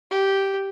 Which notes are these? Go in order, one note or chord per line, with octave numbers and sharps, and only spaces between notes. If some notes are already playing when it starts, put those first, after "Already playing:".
G4